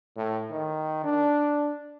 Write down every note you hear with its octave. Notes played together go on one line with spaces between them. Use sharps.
A2
D#3
D4